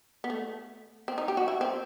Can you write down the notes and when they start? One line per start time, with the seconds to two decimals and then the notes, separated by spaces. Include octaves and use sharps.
0.24 B3
0.30 A3
1.08 C4
1.18 D#4
1.28 G4
1.37 F#4
1.48 E4
1.61 C4